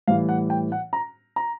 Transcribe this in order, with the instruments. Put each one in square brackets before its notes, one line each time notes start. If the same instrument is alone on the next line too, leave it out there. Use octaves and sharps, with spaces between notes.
[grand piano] A2 E3 G3 F5
F#5
G5
F#5
A#5
A#5